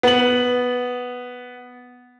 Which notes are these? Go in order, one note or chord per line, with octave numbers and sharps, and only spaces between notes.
B3 F#7